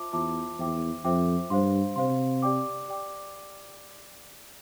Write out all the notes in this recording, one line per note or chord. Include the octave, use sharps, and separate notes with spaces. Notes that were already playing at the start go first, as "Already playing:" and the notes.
Already playing: F4 C5 E5 A5 D6
E2 F4 C5 E5 A5 D6
E2 C5 E5 G5 D6
F2 C5 E5 G5 D6
G2 C5 F5 C6
C3 C5 F5 C6
G4 D5 G5 D6
G4 D5 G5 D6